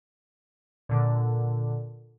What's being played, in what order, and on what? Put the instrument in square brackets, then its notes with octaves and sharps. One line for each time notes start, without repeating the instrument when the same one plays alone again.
[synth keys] A#2 D3